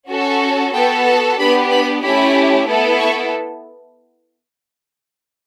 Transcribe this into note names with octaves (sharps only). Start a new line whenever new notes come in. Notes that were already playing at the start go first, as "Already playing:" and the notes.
C#4 F#4 A4
B3 F#4 A4 G5
A5
B3 D4 G4 B5
B5
A3 C#4 E4 G4 B5
B3 E4 A4
C#6